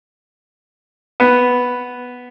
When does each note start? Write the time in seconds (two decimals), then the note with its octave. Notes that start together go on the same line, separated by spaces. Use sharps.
1.20 B3